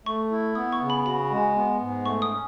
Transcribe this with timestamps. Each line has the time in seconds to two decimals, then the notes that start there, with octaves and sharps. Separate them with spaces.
0.06 A3 C#6
0.31 E4
0.55 B3 D#6
0.72 C#6
0.81 C#3
0.90 B5
1.06 F#4 B5
1.31 G#3
1.56 B3
1.80 G#2
2.05 A3 C#6
2.22 D#6
2.30 C#4